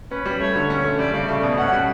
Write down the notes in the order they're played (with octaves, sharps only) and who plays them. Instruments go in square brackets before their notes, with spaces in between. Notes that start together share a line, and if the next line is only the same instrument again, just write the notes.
[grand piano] C#4 [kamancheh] B4
[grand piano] G3
[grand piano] A3 [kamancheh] C#5
[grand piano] D3
C#4
A3
[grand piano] G3 [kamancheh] D5
[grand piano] C#3
A3
B2
[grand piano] C#4 [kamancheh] F#5
[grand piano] G3